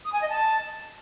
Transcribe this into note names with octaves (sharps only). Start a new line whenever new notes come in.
D#6
G#5
D#5
A5